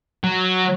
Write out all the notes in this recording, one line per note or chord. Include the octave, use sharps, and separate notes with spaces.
F#3